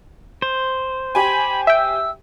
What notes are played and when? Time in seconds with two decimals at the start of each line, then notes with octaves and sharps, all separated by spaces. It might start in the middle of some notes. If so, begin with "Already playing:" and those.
0.42 C5
1.15 G4 G#5 B5
1.67 E5 G5 E6